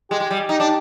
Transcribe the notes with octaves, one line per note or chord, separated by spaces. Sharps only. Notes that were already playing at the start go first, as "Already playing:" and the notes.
G#3 G4
G#3
G3
G4
D#4
D4